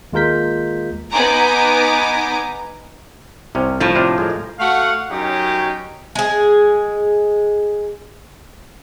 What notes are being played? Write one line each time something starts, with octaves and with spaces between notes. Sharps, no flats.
D#2 G#3 F4 A#4 G6 B6
B3 D#4 G#5 A#5 D6
C2 C3 C#4
A2 F3
C3 D4 F4
G#3 G#4 A#4
A3 F#4 F5 F#5
F#2 F#3 C#4 D#4 G4
G#3 G#4